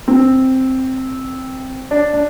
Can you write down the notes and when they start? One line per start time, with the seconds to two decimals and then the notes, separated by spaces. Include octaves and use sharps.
0.08 C4
1.91 D4
2.13 D4